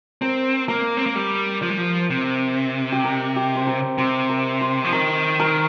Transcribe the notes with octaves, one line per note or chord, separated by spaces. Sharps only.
C4 A#4
A#3 A#4
C4
A#3
G3
F3
G3
F3
C3
G4
A#4
G4
C5
A#4
C3 C5
A#4
C5
F3
D#3 A#4
A#4